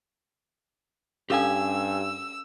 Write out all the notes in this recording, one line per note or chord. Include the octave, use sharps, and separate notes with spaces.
G2 C#4 G4 A4 F5 G#5 E6